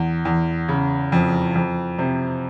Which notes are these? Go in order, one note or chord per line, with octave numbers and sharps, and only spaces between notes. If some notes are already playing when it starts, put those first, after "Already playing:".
Already playing: E2
E2
C#3
F2
F2
C3